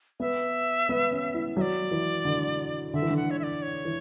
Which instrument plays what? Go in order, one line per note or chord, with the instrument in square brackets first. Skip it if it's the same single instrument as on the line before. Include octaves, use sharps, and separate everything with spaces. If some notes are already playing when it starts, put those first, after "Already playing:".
[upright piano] B3 [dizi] E5
[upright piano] B3
C#4
E4
[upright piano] F#3 [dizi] E5
[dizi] D5
[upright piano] E3
D3
[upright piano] D3 [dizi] E5
[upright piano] E3
D3
[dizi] F#5
C#5
E5
D5
C#5
[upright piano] E3